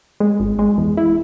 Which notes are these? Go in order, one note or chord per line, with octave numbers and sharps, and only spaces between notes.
G#3
G#1
G#3
E2
E4